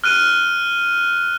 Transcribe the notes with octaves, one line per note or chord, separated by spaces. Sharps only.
F6 F#6 D#7